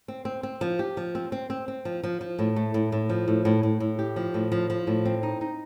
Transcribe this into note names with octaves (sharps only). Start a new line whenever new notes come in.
C4
C4
C4
F3
G4
F3
C4
C4
C4
C4
F3
F3
F3
A2
A3
A2
A2
F3
A2
A2
A2
A2
G4
F3
A2
F3
F3
A2
C4
D#4
D#4